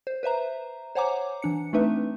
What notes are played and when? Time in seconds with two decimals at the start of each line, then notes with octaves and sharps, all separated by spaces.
0.07 C5
0.23 B4 C5 E5 A#5
0.95 C5 C#5 F#5 G#5 A#5 D6
1.42 E3 D4 C#7
1.73 A3 C4 D4 D#4 B4 E5